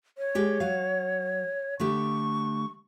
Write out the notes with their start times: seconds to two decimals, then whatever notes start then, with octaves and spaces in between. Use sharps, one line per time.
0.18 C#5
0.35 G#3 G4 D5
0.60 F#3 F5
1.80 D3 A3 G4 C#6